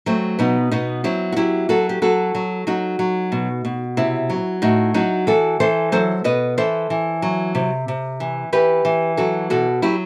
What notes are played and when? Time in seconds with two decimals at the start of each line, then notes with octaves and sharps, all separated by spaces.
0.06 F#3 A3 C4
0.39 B2 B3 D#4
0.71 B2 B3 D#4
1.04 F#3 C4 E4
1.32 F#4
1.36 F#3 E4 G4
1.69 F#3 F#4 A4
1.89 G4
2.02 F#3 F#4 A4
2.35 F#3
2.67 F#3 D#4 F#4
2.99 F#3
3.32 B2
3.65 B2
3.97 C3 C4 E4
4.30 F#3
4.62 A2 D#4 F#4
4.94 F#3 D#4 F#4
5.27 E3 F#4 A4
5.60 E3 A4 C5
5.92 F#3 A4 C5
6.24 B2 B4 D#5
6.58 E3 A4 C5
6.90 E3
7.22 F#3
7.55 C3
7.88 C3
8.20 E3
8.53 E3 G4 B4
8.85 E3
9.17 F#3 F#4 A4
9.50 B2 F#4 A4
9.82 F#3 E4 G4